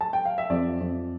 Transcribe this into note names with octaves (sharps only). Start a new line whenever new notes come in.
A5
G5
F5
E5
F2 D5
F2